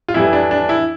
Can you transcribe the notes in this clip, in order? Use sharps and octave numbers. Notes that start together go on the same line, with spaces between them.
F4
F2 E3 G3 E4
D4
D4
E4